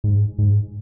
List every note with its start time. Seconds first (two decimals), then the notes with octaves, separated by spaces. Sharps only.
0.04 G#2
0.38 G#2